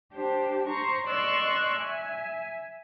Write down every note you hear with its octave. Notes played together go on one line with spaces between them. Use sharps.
D4 G4 C5
C5 A#5 C#6
D5 D#5 C6 C#6 E6 F#6
E5 G#5